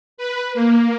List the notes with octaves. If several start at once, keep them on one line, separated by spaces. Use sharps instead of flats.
B4
A#3